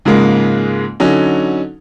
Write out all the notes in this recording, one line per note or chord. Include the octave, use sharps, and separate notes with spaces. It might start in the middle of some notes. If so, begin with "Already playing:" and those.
G#2 C#3 F3 G#3 A#3
D3 F#3 C#4 D#4